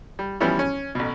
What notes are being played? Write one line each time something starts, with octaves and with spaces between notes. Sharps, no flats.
G3
E3 F3 G3 B3 C#4 E4
C#4
A1 B2